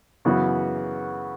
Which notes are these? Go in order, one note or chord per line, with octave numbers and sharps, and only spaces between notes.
F#2 C#3 E3 B3 F#4